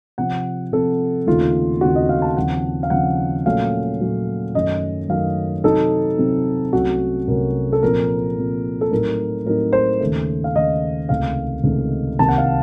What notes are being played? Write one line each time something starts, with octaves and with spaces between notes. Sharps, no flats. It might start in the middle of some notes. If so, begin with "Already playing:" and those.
C3 F3 C4 F#5
C3 F3 C4 A4
D#2 C#3 A3 C4 D#4 F4
D#2 C#3 A3 C4 D#4 F#4
D#5
F5
A5
D#2 C#3 F3 C4 F#5
F5
D#2 C#3 F3 C4 F#5
A#2 F#3 A3 C#4 F5
A#2 F#3 A3 C#4
F#2 D#3 F#3 A3 C#4 D#5
F#2 D#3 F#3 A3 C#4 F5
C3 F#3 C4 D#4 A4
C3 F#3 C4 D#4
C2 C3 F#3 A3 C#4 F#4
C2 C3 F#3 A3 C#4 A#4
A4
A#2 F3 C4 A#4
A#2 F3 C4
A4
A2 F#3 C4 D#4 A#4
A2 F#3 C4 D#4 A#4
C5
D#2 C#3 A3
F5
D#2 C#3 A3 D#5
C#2 C3 D#3 A3 F5
C#2 C3 D#3 A3
C2 C3 D#3 A#3 D#4 A5
F#5
F5